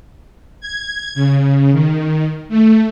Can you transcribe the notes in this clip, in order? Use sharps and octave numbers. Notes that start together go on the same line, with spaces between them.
G#6
C#3
D#3
A3